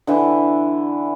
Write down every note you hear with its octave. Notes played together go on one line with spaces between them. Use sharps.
D3 E3 A4